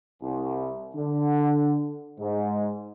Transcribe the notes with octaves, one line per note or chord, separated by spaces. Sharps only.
C2
D3
G#2